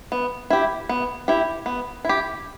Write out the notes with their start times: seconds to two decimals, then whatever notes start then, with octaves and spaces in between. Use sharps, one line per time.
0.12 B3
0.50 E4 G4
0.89 B3
1.28 E4 G4
1.66 B3
2.05 E4 G4